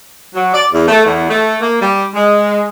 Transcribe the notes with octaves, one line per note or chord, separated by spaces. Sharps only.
F#3
D5
E2
A3
E2
A3
A#3
G3
G#3